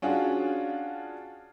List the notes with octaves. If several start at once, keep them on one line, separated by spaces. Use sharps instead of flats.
C#4 D4 F4 F#4 G#4